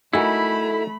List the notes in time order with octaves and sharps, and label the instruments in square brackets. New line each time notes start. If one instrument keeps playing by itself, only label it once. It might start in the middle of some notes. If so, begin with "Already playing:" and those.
[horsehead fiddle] A3 B5 [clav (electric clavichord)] D#4 F#4 A#4 [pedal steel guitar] E4 [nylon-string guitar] A4 G#5